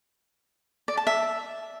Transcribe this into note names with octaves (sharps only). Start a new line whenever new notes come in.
D5
A5
E5